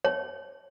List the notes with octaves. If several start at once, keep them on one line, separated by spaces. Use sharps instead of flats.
C#5